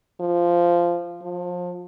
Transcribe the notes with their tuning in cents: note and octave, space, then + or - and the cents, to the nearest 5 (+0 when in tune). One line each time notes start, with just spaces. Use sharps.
F3 -10
F3 +30